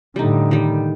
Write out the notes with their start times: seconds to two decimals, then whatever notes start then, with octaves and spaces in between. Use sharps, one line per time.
0.16 A2 D3 G3 D#4
0.51 D#3 G3